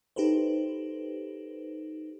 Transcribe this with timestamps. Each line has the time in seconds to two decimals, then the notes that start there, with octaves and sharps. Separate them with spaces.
0.16 D#4 G4 A4 B4 C5